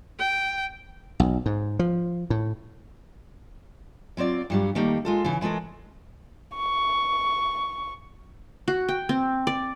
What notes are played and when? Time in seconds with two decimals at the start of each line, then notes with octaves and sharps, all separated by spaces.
0.19 G5
1.20 B1
1.46 G#2
1.79 F3
2.30 A2
4.17 F#3 C4 F4 D5
4.50 G2 F#3 G3
4.75 D#3 G3 A3 A#3
5.05 G#3 F4 A4
5.25 C#3 E3
5.41 E3 G#3 A3 A4 A#4
6.56 C#6
8.68 F#4
8.89 G5
9.09 C4
9.47 D5